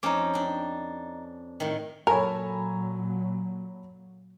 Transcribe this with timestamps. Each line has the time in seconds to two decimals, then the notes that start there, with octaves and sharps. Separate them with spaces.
0.03 F2 C#4 D#4 C5 D6
0.33 D4 G5
1.60 A2 D#3
2.07 A#2 F#3 A4 A#4 C#5 G#5 A#5 B5